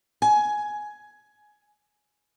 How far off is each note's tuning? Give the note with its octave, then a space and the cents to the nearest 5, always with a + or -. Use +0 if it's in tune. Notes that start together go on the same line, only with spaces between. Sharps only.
G#5 +10